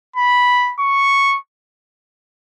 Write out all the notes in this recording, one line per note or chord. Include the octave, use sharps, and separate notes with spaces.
B5
C#6